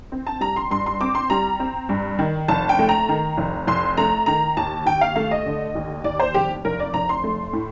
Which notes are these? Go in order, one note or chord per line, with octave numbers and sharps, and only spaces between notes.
C4
A5
G3 A#5
C6
G2 C6
C6
C4 D6
C6
G3 A#5
C4
G2
D#3
F1 A5
G5
A3
A#5
D#3
F1
F1 C6
A3 A#5
D#3 A#5
D#2 A5
D#2 G5
F5
A3 F5
D#5
D3
D#2
D#2 D5
C5
F1 G4
F1 A#4
D5
F1 A#5
C6
A3
A2